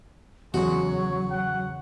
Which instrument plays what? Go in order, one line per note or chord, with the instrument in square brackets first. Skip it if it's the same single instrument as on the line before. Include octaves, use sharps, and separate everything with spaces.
[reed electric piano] E2 C#3 C#6 [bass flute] F#3 [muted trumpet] G#3 [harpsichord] F#4
[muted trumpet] C#5
F#5